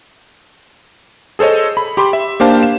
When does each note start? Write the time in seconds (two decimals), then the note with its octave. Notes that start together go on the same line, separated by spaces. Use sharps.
1.39 G#4 A4 C5 C#5 D#5
1.77 B5
1.97 G4 B5 C6 D6
2.13 E5
2.40 A#3 D4 G4 C5 F5 A5
2.63 E7